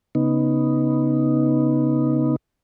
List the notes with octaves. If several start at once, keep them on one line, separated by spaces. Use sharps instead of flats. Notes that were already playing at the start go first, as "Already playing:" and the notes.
C#3 B3 D#4